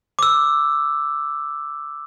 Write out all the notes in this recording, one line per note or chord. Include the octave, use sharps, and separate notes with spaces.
D6 E6